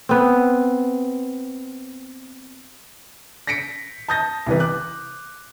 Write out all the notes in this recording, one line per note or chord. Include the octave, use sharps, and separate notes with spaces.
B3 C4
A#6 B6 C#7 D7
A5 D#6 G6 A6 A#6
C2 E3 B4
D6 F#6